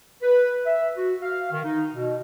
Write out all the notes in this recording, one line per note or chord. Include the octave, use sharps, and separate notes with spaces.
B4
E5
F#4
F5
D#3
D#4
B2